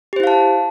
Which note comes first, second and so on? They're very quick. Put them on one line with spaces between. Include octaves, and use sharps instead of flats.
G4 C5 E4 F5 A5